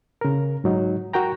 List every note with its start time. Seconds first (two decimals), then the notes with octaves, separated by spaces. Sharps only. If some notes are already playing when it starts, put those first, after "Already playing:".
0.21 C#3 A#4
0.64 G#2 F#3 D#4
1.13 F#4 A#4 G5 A#5